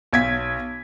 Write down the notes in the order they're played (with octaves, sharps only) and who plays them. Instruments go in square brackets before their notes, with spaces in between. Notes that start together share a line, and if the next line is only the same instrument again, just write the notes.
[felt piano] B1 G#6 B6